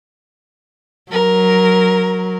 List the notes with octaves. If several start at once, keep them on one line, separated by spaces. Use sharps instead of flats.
F#3 A#4